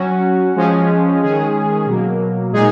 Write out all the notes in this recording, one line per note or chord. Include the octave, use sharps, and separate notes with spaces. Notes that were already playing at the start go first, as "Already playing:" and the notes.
Already playing: F#3 C#4 F#4
F3 G#3 C#4
D#3 G#3 C#4 G#4
B2 F#3 A#3
A#2 G#3 D#4 G#4